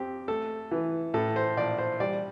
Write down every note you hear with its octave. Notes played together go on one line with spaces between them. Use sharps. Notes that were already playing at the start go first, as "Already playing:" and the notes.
Already playing: F2 C4 G4
A3 A4
E3
A2 A4
C5
A#1 D5
C5
G3 D5